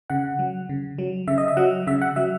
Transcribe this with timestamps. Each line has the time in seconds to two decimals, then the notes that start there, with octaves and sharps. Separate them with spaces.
0.10 C#3 F#5
0.39 F#3
0.69 C#3
0.98 F#3
1.27 C#3 E5
1.38 D#5
1.48 E5
1.57 F#3 F#5
1.87 C#3 E5
2.02 F#5
2.16 F#3 E5